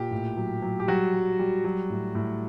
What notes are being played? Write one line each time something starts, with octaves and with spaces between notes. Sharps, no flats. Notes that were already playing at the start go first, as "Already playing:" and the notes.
Already playing: A#2 G4
A2
F#3
F#3
G4
F#3 G3 F#4
G3
G3
F#3
A2
A2